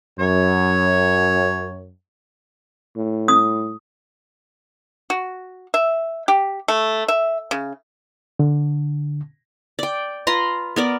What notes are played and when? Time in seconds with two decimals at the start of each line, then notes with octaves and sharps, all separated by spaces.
0.19 F#2 C#5
2.97 A2
3.28 D#6
5.10 F#4
5.74 E5
6.28 G4
6.68 A3
7.08 E5
7.51 C#3
8.39 D3
9.79 D5 G5
10.27 F4 B4 A#5 C6
10.76 B3 A#4 D5